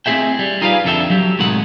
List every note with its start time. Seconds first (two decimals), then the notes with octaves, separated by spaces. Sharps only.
0.06 A3 C4 E4 G#4 E5 G5
0.39 G3
0.62 D#4 F4 G#4 B4 D5 F5
0.85 F2 D3 D4 A4 E5 G5
1.10 F#3 G4
1.39 A2 C3 D#3 G#3 F#5